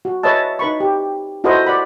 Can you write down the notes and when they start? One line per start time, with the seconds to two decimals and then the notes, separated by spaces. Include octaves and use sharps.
0.05 F#4
0.23 B4 C#5 D#5 E5 A5
0.59 D#4 B4 B5 C#6
0.80 G4
1.44 E4 F#4 A4 B4 C5 D#5
1.66 D5 F#5 B5